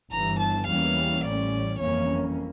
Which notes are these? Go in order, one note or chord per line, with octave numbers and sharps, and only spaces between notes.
G1 G2 E3 A#5
A5
E2 E3 G3 A#3 C#4 F5
A1 A2 G3 C#4 D5
G1 F2 E3 A#3 C#4 C#5